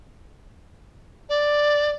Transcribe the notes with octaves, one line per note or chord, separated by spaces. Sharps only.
D5